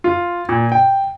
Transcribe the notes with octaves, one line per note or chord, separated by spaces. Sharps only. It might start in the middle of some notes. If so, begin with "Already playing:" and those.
F4
A#2
G5